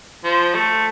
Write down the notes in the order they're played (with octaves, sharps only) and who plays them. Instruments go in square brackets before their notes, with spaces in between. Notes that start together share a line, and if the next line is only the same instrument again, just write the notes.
[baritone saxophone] F3
A3